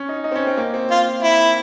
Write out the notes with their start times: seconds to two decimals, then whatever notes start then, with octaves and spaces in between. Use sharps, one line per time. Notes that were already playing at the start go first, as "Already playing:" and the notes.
Already playing: C#4
0.09 D#4
0.24 D#4
0.32 C4
0.35 C#4
0.47 C4
0.57 A#3
0.74 C4
0.91 F4
1.23 E4